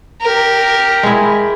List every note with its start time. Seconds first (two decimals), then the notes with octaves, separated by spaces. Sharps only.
0.22 G4 A#4
1.03 G#3 E4